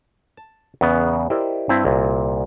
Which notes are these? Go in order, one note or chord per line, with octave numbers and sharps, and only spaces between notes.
A5
E2 C#3 B3
E4 G4 A#4 C5 D5 D#5
G2 C4 E4
C2 A#2